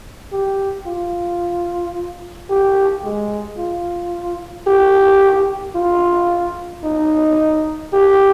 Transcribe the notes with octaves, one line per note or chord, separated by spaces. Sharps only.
G4
F4
G4
G#3
F4
G4
F4
D#4
G4